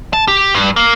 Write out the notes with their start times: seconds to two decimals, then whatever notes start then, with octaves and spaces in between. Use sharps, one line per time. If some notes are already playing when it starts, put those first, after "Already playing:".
0.13 A5
0.28 G4
0.55 G2
0.76 A#3